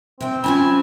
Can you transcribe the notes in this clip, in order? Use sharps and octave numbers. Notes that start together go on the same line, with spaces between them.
C3 C4 G5
F#3 C#4 F4 G#5 A5 B5